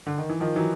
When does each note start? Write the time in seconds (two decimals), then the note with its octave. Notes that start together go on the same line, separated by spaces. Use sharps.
0.07 D3
0.18 D#3
0.29 E3
0.40 D#3 F3
0.56 E3 F#3